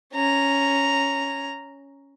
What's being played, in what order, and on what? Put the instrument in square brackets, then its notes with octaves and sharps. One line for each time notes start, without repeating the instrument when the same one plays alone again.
[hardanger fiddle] C#4 A#5